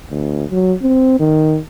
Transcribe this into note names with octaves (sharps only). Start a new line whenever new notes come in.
D2
F#3
C4
D#3